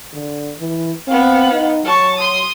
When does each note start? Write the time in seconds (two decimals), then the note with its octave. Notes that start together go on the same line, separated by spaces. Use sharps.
0.13 D3
0.58 E3
1.07 B3 C4 F5
1.52 D#4
1.85 F#3 A5 C#6
2.18 C6 D#6